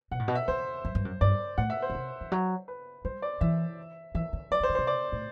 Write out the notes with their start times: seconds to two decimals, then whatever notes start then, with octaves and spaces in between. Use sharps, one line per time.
0.11 B2 F#5
0.19 A2
0.28 B2
0.35 E5
0.48 E2 C5
0.85 F#2
0.95 G2
1.05 F#2
1.21 G2 D5
1.58 A2 F#5
1.70 E5
1.82 C5
1.90 D3
1.95 C3
2.21 E3
2.32 F#3
2.68 B4
3.05 G3 C5
3.22 D5
3.41 E3 E5
4.15 E3 E5
4.33 D3
4.51 F#3 D5
4.60 E3
4.63 C5
4.69 D3
4.75 C3 C5
4.87 D5
5.12 A2